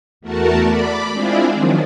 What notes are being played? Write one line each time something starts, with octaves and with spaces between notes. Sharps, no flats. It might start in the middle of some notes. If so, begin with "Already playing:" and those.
E2 A3 F#4 A#4 A5
D5 B5 D6
G#3 C4 D4 E4 F4 G#4
D#3 F3 F#3